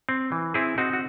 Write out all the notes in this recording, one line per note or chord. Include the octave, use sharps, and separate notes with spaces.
C4
E3
C4 E4 G#4
C4 D#4 F#4
F#4